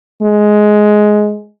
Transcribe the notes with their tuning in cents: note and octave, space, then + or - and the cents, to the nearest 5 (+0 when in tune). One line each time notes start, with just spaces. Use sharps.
G#3 +10